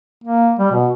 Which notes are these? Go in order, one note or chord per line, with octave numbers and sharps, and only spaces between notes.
A#3
G3
B2